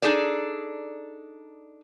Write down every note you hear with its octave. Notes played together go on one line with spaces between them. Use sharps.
D4 D#4 G#4 A4 D5